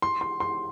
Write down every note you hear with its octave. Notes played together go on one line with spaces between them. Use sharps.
C6
C6
C6